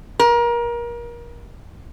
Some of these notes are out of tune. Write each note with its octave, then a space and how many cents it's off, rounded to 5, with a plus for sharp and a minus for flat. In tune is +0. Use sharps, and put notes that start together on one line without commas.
A#4 +30